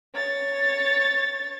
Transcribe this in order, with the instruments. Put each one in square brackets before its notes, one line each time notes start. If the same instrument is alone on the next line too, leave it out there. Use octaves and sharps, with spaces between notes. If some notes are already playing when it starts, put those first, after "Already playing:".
[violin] C#5 A6